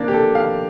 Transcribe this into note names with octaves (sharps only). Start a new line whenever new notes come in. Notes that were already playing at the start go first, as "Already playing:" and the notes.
Already playing: A#3 C4 D4
G4
A4
F5